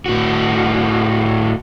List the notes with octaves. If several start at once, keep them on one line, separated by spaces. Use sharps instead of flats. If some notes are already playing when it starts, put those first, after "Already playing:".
A2 F#4